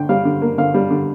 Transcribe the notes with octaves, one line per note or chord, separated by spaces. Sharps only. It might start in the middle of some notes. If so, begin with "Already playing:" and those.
Already playing: D3 G5
G3 F5
D3
A#3
D3 F5
G3
D3